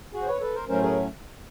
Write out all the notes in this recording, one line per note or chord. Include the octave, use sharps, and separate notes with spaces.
F#4 G#4
C5
B4 C#5
A4 B4
A#4 C5
A2 F#3 A3 C#4 A#4 C5
G#4 A#4